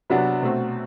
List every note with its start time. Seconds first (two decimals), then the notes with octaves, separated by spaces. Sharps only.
0.10 C3 F#3 B3 D4 F#4
0.43 B2 A3 C4 F#4